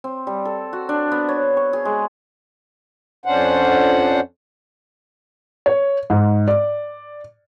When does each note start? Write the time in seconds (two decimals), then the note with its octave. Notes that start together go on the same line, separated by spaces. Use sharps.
0.04 C4
0.27 G3
0.45 A4
0.73 F#4
0.89 D4
1.12 B3
1.28 C#5
1.57 C#6
1.73 G#4
1.85 G#3
3.26 F2 C#4 D4 C5 F#5
5.66 C#5
6.10 G#2
6.48 D5